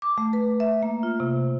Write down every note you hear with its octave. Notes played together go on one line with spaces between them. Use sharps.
D6
A3
B4
E5
A#3
F4
C3